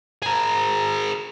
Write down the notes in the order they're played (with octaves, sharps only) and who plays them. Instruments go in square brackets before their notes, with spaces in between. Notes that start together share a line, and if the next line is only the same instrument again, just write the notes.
[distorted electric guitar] G#4 A#4